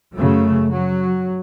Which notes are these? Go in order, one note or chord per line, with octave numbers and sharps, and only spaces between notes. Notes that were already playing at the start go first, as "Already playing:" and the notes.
F#2 C#3 A3
F#3